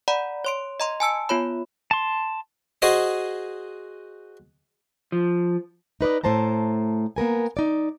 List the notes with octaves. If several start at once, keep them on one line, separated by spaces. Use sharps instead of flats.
D5 F#5 A#5 B5
C#5 C6 D7
D#5 A#5 C6
G#5 A5 E6 C#7
B3 F4 C#5 B5
A5 C6
F#4 G#4 C5 D#5
F3
D#4 B4 D5 D#5
A2 A3 C5 A5 A#5
A#3 B3 A#4 G#5
D#4 D5